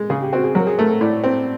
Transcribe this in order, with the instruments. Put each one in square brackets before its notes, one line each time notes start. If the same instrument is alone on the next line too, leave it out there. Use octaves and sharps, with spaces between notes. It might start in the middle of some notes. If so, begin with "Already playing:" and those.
Already playing: [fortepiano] G#3
[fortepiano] C#3 [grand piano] G#4
[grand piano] G4
[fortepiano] C4 [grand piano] F#4
[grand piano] G#4
[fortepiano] F#3 [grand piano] A#4
[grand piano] G#4
[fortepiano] A3 [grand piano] A#4
[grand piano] A4
[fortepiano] A2 [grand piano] D5
[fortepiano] C4